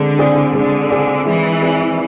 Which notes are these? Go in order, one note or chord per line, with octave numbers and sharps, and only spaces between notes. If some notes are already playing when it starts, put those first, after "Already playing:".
Already playing: D3 G#3 C4
C4 G#4 D5
D3 G#3
C4 G#4 D5
E3 G#3
C4 G#4 D5